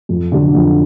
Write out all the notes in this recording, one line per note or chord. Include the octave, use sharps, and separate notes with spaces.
F2
D3 F#3
F2